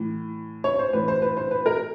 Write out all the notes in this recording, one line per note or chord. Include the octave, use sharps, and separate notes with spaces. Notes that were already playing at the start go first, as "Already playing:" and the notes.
Already playing: A2 E3
C#5
C5
A2 E3 B4
C5
B4
C5
B4
A#4